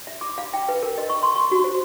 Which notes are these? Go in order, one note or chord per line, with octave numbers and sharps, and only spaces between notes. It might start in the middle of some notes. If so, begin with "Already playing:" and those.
E5
D6
F5
G5
B4
A#4
D#5
C#6
C6
C#6
F#4
C5